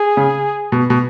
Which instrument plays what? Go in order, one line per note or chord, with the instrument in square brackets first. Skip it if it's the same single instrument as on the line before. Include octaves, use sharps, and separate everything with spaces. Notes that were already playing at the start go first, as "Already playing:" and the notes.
Already playing: [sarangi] G#4
[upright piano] C#3
B2
B2